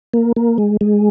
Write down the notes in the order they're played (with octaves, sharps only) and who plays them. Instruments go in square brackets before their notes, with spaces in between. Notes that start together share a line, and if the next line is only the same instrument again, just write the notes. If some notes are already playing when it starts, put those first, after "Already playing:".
[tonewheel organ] A#3
A#3
G#3
G#3